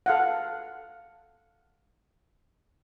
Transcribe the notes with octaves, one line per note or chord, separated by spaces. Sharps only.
A4 F5 F#5